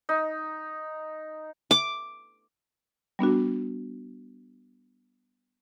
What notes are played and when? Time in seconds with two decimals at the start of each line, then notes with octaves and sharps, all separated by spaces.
0.09 D#4
1.71 D6
3.19 G3 B3 D4 F#4